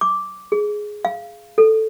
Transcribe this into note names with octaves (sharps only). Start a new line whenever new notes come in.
D6
G#4
F5
A4